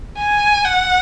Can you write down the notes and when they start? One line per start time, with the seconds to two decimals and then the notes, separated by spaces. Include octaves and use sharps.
0.19 G#5
0.65 F#5